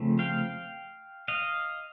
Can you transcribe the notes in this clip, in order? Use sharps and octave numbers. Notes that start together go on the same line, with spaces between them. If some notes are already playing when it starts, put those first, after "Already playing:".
Already playing: C#3 F3 A3 C4
F5 G5
D#5 F5